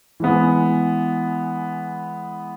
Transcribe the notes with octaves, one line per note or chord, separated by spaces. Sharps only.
E3 G#3 B3